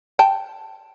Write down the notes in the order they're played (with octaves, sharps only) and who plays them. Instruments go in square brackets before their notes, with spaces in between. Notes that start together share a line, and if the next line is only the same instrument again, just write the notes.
[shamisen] G5 A5